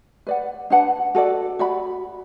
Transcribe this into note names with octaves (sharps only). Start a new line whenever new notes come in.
B4 D5 F#5
D4 B4 F#5 A5
F#4 A4 D5
F#4 D5 B5